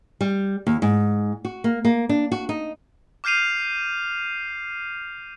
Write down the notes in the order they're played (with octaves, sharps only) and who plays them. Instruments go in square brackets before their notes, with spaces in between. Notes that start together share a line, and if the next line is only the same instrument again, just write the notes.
[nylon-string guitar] G3
D#2
G#2
F#4
A#3
A#3
D4
F#4
D#4
[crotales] D6 F6 G6 C7 D#7 F7